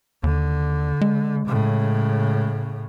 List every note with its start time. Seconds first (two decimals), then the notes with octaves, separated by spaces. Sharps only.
0.24 D#2 D3
1.01 G#3
1.46 A2 C#3